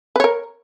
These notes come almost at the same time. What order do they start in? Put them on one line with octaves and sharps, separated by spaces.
B4 C#5 A#4